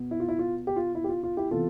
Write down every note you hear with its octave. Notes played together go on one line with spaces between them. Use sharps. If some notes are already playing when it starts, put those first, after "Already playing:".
Already playing: B2 B3
E4
F4
E4
F4
G4
F4
E4
G4
F4
F4
E4 G4
C3 E3 B3 F4 A4